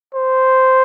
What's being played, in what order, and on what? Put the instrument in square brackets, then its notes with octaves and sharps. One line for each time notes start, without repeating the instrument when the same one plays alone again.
[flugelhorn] C5